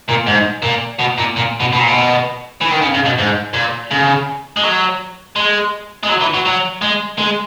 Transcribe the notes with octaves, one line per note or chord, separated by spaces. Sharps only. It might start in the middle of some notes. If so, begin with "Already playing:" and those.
A#2
G#2
A#2
B2
A#2
A#2
B2
B2
A#2
B2
E3
D#3
C#3
C#3
B2
G#2
A#2
C#3
G#3
F#3
G#3
G#3
F#3
E3
F#3
F#3
G#3
G#3